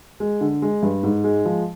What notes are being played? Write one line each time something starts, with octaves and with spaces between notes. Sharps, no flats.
G#3
D3
G#3
G2
G#2
G#3
F3